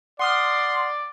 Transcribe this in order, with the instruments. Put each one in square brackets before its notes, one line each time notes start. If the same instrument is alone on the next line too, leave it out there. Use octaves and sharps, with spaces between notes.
[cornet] D5 [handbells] F#5 D#6 F6 [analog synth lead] C6